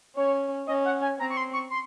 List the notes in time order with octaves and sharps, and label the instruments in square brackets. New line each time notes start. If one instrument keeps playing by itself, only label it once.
[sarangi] C#4 [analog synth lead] C#5
[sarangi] C#4 [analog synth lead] D#5
[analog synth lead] F#5
G#5
[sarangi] C4 [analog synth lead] A#5
[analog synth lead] C#6
C6
C#6
C6